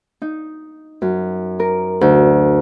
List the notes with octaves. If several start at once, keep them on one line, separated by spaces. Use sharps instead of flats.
D#4
F#2
A#4
D2